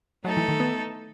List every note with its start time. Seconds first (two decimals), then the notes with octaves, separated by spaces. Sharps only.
0.25 F#3 A3 D#4 A4
0.37 E3
0.48 D#3
0.60 B3